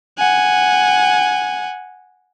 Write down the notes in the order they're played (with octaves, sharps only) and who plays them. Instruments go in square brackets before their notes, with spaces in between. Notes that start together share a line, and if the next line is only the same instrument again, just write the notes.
[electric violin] F#5 G#5